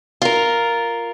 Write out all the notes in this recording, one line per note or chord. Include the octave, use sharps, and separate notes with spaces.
F4 A#4